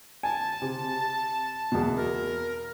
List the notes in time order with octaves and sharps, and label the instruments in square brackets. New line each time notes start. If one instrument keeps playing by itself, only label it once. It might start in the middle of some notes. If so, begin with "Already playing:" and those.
[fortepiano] G#5 [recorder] A5
[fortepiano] C3
E2 B2
[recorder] A#4